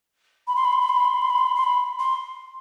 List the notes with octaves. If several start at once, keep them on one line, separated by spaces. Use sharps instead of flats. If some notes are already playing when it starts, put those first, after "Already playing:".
B5
C6
B5
C6
B5
C6
B5
C6
B5
C6
B5
C6
B5
C6
B5
C6